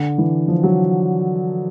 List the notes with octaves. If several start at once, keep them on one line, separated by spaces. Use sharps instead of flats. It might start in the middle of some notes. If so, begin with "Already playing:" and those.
Already playing: D3
E3
F3
F#3